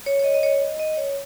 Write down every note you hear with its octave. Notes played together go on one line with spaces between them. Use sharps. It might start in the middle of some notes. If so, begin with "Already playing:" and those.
C#5
C#5
D#5
D#5
C#5
D#5
D#5
C#5